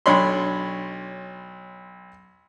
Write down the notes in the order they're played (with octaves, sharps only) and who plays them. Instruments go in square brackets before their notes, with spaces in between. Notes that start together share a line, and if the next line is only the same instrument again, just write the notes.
[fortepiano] B1 D4 C#5 B5 C6